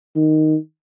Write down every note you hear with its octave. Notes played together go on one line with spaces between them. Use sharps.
D#3